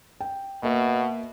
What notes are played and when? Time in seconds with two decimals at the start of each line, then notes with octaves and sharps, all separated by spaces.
0.21 G5
0.63 B2 A#3 E5